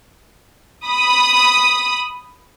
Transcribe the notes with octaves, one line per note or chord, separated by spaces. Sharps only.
B5 D#6